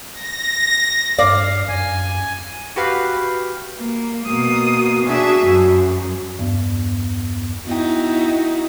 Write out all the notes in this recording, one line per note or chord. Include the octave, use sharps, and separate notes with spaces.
A#6
G2 D5 F5
F#2 G#5
F#4 G4 B4 F5
A#3
B2 A#3 D#6
D4 F#4 G#4 E5
F#2
E2 G2 B3
B3 D#4 E4 F#4 G5